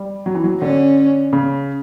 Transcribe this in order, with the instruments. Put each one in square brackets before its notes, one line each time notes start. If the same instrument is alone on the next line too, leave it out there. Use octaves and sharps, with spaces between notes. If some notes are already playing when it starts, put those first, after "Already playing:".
Already playing: [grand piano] G3
F#3
E3
F#3
[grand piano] D3 [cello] C#4
[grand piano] C#3